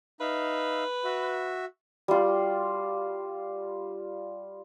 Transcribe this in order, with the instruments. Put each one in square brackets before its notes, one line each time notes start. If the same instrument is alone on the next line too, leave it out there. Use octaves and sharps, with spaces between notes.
[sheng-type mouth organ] D#4 E5 F5 [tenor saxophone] B4
[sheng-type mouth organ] F#4 E5
[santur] G3 F4